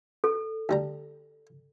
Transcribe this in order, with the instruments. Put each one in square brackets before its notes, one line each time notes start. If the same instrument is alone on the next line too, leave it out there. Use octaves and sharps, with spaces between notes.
[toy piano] A4
[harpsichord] D2 G3 A#5